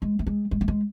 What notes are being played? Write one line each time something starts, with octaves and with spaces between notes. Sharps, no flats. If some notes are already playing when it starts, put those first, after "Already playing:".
G#3
A3
G#3
G#3
A3
G#3